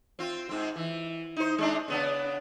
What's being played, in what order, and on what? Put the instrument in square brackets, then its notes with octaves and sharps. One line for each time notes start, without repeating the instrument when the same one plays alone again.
[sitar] C4 F4
G#2 C4
E3
D#4 C5
G#3 D4 D#4
C#3 B3 D4